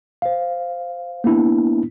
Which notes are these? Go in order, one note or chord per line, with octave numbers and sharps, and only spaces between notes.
C5 F5
A#3 B3 D4 E4